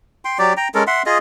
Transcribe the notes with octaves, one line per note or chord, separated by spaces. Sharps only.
G5 C6
F#3 G4 D5
G5 A#5
G#3 C#4 A4 A#4
E5 F#5 C6
F4 G#4 D#5